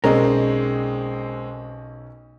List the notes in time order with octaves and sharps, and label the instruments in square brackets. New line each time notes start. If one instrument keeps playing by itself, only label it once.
[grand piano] B1 C#4 [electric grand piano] G#3 C4 [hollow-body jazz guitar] A#4 D5 D#5